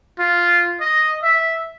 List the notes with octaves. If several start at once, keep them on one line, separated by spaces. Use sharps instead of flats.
F4
D#5
E5